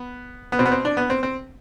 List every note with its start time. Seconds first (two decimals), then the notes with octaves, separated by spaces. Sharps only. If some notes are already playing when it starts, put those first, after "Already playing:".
Already playing: B3
0.52 B3
0.59 B2 C4
0.65 B3
0.72 C4
0.85 D4
0.97 B3
1.10 C4
1.23 C4